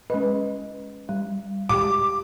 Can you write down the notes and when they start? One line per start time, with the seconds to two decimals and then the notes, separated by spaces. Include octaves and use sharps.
0.10 G#3 C#4 B4 D#5
1.09 G3
1.69 G#3 G4 D6